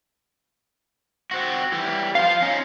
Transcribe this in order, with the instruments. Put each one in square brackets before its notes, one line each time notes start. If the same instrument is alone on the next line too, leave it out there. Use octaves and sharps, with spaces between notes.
[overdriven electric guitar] C4 F#4
E3 G3
[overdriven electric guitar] F4 C5 [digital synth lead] F5
[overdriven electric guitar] C#4 D#4